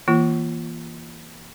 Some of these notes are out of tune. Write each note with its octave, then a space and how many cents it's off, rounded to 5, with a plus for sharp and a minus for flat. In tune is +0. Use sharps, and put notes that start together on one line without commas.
E3 -20 A#3 +10 F4 -20